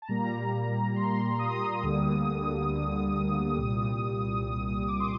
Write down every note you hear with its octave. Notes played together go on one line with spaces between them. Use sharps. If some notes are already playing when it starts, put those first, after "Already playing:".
A5
A#2 G3 A#3 A#5
C6
D#6
D2 D3 G3 A#3
C2 A#2 G3
D6
C6